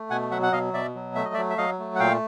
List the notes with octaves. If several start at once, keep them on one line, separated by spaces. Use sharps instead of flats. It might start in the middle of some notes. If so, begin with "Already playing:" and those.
Already playing: A3
B2 F#5 G#5
F#3 E5 F#5
F#5
B2 D#5 F5
B2 D5 E5
F#3
A3 E5
D#5
D5 E5
F#3
E5
F#3 D#5 F5
A3
F#5
A#2 F5 G5